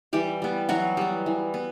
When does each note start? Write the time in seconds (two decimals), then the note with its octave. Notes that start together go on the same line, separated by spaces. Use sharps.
0.13 E3 G3 G4
0.42 G3 B3
0.69 E3 F#3 F#4
0.97 G3 B3
1.26 E3
1.54 B3